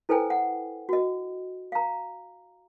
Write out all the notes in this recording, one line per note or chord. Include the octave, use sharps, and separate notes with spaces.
E4 A4 B4 C5 G5 G#5
F#5
F#4 D#5
F5 A#5